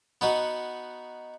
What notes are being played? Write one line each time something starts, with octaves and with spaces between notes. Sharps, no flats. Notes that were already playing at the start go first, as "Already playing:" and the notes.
B3 D#4 F#4